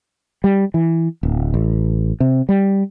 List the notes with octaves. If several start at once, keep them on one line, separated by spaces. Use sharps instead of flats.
G3
E3
D1
A1
C3
G3